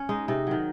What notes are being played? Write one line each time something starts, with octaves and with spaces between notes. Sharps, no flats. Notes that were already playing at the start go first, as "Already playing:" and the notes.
Already playing: C#4
G#3 D#4
C3 D#4
D#3 F#3